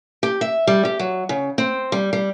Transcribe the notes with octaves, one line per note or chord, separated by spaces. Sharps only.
G4
E5
G3
G4
F#3
C#3
C4
G3
G3